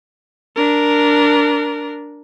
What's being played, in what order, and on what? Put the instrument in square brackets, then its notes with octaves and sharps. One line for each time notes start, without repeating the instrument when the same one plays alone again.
[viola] D4 A#4